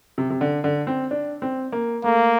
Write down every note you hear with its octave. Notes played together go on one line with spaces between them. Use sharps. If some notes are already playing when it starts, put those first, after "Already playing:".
C3
C3
D3
D3
C4
D4
C4
A#3
A3 A#3